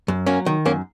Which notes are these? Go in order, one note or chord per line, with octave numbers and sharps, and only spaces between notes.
F#2
F#3 A#3 C#4
D#3
F#2 A#3 C#4